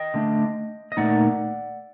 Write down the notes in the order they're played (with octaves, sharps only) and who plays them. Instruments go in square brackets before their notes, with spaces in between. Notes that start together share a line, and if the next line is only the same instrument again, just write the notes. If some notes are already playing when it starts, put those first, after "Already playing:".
Already playing: [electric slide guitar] D#5 G5
D3 A3 D4
D#5
A#2 A3 D#4 D5 F#5